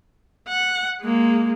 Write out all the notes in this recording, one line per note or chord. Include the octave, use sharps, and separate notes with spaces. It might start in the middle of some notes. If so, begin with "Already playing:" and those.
F#5
G#3 A#3